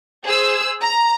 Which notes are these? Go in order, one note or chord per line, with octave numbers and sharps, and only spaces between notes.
G#4 C5 E6
A#5